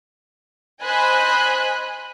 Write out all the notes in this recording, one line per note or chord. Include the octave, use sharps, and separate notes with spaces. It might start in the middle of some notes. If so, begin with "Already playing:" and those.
C5 D#5 G#5 B5 F#6